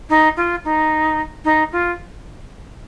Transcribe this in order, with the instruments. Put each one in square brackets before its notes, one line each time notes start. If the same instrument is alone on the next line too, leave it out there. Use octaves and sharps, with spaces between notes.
[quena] D#4
F4
D#4
D#4
F4